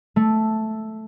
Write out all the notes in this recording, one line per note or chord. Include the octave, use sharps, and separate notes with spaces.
A3